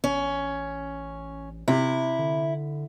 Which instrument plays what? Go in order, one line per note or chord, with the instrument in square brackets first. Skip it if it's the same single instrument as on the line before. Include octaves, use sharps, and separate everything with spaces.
[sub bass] A1 [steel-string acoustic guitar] C#4
[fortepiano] C3 [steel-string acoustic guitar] E4
[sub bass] D3